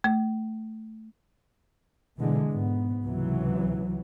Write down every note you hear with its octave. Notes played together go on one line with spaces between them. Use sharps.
A3
B2 D3 E3 G#3
G#2 B3
C#2 C3 E3 F#3